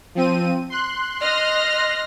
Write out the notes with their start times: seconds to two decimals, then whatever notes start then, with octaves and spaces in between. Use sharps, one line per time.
0.15 F3 C4 D#7
0.70 C6 F#6
1.21 D#5 F6 A#6